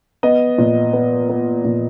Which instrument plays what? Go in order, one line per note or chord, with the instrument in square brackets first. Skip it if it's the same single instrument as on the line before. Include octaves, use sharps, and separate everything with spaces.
[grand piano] B3 D#5
A#2
B3
B3
A#2